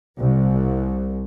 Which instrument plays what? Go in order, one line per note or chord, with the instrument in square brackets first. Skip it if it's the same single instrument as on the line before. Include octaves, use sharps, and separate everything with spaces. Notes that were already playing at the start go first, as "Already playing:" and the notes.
[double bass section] C2